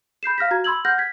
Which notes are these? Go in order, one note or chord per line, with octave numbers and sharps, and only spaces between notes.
B5 G6 C7 E7
F5 F6 A#6 B6
F#4 A#5 G#6
B5 C6 E6 G#6 F#7
F#5 F6 G6 A#6
G#6 B6